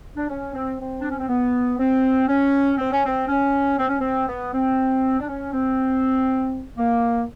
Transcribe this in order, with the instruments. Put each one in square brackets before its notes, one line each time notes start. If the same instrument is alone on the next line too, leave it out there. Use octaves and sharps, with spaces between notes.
[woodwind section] D4
C#4
C4
C4
D4
C#4
C4
B3
C4
C#4
C4
C#4
C4
C#4
C4
C#4
C4
B3
C4
D4
C#4
C4
A#3